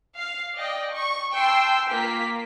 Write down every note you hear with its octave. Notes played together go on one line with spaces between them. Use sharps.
F5
D5 D#5 G5
C#6
G5 A5 C6 E6
A#3 F4 B6